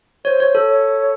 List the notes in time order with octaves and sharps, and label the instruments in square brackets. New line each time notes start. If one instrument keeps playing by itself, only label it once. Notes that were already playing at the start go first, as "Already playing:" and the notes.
[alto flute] C5 [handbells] C#5
[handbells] C#5
A4
[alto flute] C#5